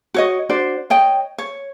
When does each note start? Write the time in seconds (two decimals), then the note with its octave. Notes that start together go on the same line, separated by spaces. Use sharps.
0.14 F#4 C#5 D#5
0.49 D4 F#4 C5 D5
0.90 C#5 D#5 G5
1.38 C#5